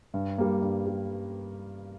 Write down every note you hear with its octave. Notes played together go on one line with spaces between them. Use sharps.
G2
G3 A#3
G2
G3